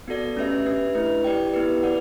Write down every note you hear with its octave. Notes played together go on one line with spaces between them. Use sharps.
B3 F#4 A4 D5
A3 C#4 G4 B4 E5
D4 G4 B4 E5
A3 E4 B4
E4 G4 D5 G5
B3 E4 G4 B4
F#4 B4 D5 F#5